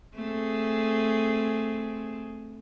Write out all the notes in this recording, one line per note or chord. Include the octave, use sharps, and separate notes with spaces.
A3 C4 G#4